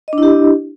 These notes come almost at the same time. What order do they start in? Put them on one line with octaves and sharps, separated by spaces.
D#5 D4 E4 G4